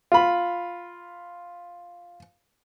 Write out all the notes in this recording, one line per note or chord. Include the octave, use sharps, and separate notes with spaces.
F4 B5